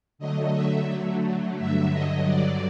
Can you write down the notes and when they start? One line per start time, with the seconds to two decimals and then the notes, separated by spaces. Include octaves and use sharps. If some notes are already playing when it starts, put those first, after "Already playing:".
0.19 D3 F#3 A3 D#5
0.53 E5
1.58 G2 D3 F#3 E5
1.92 D#5
2.27 D5